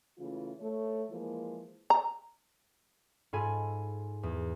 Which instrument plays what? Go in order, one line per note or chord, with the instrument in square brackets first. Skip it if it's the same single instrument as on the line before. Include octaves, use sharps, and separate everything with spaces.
[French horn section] C#3 E3 A3 F4
A3 C#5
E3 F3 G#3 A#3
[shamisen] A#5
[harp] G#2 F4 A4 G#5 B5 D#7
E2